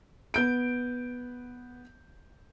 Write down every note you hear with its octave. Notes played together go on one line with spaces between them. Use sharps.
B3 G6 D7